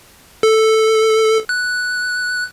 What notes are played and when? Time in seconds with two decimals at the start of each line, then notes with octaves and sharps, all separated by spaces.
0.43 A4
1.49 F#6